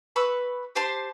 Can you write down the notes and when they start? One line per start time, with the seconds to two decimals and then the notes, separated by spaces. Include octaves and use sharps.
0.16 B4 B5 C#6 E6
0.75 G4 C5 A5 C6